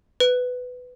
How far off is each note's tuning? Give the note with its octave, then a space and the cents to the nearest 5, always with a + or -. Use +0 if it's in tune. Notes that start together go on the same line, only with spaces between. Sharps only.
B4 +15